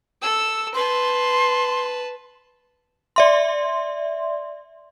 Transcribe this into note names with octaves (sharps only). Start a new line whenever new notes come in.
A4 E6
B4 A5 C6
D5 E5 C6